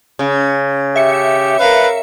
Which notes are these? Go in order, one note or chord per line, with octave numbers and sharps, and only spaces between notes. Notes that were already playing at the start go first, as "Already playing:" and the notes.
C#3
G4 E5 C#7
A#4 B4 F5